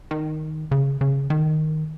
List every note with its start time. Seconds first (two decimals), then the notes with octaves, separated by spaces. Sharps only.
0.11 D#3
0.71 C#3
1.01 C#3
1.30 D#3